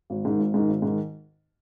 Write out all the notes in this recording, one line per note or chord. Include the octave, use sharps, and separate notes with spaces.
G#1
G#2 D#3
G#1
G#2 D#3
G#1
G#2 D#3